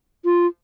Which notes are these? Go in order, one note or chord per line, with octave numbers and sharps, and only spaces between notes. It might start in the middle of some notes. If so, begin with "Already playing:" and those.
F4